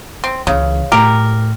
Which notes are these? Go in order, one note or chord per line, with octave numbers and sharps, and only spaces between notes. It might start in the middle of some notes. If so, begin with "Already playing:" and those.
C4
C#2 C#3 E3
A2 G4 A#4